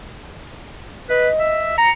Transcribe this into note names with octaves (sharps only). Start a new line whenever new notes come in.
B4 D#5
E5
A#5 C#7